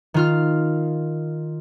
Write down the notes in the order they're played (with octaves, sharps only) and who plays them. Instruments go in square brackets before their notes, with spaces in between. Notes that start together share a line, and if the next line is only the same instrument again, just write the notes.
[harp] D#3 F4 F6